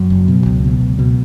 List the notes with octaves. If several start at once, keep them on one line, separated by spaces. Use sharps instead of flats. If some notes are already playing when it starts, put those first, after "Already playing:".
Already playing: F#2 F#3
F#1
B2
C#2
B2
C#2
B2